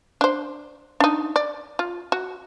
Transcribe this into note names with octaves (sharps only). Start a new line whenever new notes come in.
D4 C5
D4 D#4
D5
F4
F#4